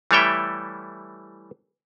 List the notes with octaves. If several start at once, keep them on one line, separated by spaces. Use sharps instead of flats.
E3 G3 A3 C#5 E5 G5